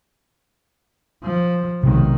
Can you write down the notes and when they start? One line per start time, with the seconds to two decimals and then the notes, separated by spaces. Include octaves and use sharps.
1.24 F3
1.83 B1 C3 D#3 G#3